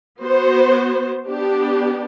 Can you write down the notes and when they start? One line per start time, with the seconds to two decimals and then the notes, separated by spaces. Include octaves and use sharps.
0.20 B3 F#4 C5
1.27 B3 D4 G4